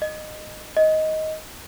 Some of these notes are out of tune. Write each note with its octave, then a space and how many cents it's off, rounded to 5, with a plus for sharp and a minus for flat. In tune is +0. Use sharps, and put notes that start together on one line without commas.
D#5 -15
D#5 +10